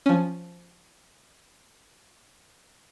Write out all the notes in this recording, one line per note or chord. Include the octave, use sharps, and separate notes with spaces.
F3 C#4